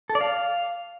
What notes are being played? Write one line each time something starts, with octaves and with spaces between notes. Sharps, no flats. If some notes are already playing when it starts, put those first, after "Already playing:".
A4
D5
F5